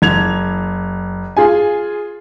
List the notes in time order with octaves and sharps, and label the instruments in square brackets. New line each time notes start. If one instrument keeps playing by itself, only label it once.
[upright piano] F#1 G#6 F7
F4 G#4 G#5